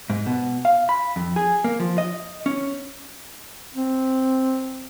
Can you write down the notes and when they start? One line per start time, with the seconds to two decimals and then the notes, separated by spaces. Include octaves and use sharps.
0.10 G#2
0.26 B2
0.65 F5
0.89 B5
1.16 F2
1.36 G#4
1.64 A#3
1.80 F3
1.98 D#5
2.46 C#4
3.74 C4